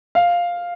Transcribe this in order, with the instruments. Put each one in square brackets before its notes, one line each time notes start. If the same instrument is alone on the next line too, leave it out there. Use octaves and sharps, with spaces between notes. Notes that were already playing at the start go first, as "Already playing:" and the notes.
[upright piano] F5